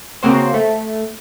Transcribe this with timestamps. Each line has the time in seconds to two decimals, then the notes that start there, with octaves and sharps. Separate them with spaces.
0.23 C#3 A#3 C4 F#4 C5
0.54 A3